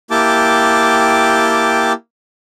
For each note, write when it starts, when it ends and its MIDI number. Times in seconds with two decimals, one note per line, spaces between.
0.11 1.93 58
0.11 1.93 64
0.11 1.93 67
0.11 1.93 79
0.11 1.93 81
0.11 1.93 86